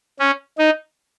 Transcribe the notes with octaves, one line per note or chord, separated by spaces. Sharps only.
C#4
D#4